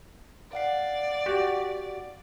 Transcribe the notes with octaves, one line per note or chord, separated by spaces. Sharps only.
D5 F5 F#5 C7
F#4 G4